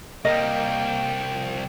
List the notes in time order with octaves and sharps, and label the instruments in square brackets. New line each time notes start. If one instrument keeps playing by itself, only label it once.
[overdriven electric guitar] C2 G3 [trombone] A#3 [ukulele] A#4 D#5 [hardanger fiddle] G5
[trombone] F3